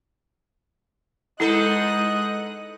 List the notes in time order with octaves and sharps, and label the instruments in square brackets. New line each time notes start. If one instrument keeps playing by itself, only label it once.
[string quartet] G#3 D#6 F#6 [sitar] B3 D#4 A4 [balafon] E4 [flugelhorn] D#5